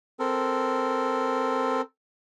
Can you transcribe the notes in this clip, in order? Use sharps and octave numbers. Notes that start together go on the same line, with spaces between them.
C4 A4 A#4